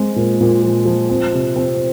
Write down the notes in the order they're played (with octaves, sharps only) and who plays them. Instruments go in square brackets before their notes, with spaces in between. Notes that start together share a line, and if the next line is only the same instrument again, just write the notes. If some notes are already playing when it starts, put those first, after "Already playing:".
Already playing: [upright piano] G#3 C4
A#2
A#2
F3
F3
C4
C3
C4